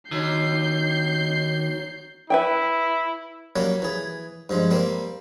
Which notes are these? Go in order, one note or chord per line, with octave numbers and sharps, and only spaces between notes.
D#2 D#4 F#4 C#5 G6 C7
E4 B4 E5 G5
F#3 G3 A#3 C#4
E3 G#4
G2 F3 G#3
G3 A#3 C4